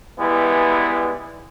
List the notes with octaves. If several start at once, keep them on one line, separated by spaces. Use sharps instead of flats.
E3 G3 G#3 B3 E4